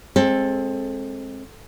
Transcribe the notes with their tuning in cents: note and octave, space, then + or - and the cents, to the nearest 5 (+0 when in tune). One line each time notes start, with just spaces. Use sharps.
G#3 +0 C4 +20 A4 +0